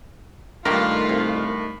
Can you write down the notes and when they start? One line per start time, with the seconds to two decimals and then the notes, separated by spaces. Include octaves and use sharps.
0.65 G2 D#3 A3 A#3 F4 G4 A#4
1.09 C2